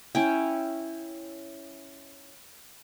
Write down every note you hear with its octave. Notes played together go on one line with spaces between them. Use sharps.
C#4 E4 G5